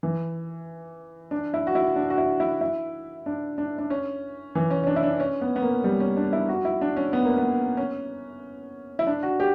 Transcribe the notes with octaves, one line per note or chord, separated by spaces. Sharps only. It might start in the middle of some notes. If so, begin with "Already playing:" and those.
E3
D4
E4
F#4
E4
D4
F#4
E4
E4
E4
D4
D4
D4
C#4
E3
C#4
C#4
D4
E4
D4
C#4
B3
B3
A#3
G3
C#4
D4
E4
F#4
E4
D4
C#4
B3
A#3
B3
C#4
E4
D4
F#4
G4